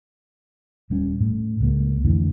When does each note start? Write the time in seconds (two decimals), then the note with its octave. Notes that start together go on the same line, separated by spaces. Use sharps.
0.90 D#1 G3 C#4
1.20 A2
1.60 C#2 G#3 A#3
2.04 F2 A2 D3 E3